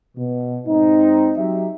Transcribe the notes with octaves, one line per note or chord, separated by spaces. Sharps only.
B2
G#2 C4 D#4
F#3 D#4 G4 E5